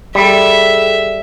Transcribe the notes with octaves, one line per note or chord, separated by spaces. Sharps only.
G3 G#4 A4 E5